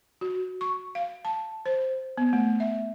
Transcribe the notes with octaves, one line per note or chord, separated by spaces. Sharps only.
F#4
C#6
F5
A5
C5
B3
A3
E5